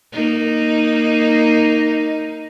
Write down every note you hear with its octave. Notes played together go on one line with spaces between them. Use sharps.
A#3 D#4